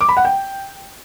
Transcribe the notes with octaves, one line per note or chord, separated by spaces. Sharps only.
D6
B5
F#5
G5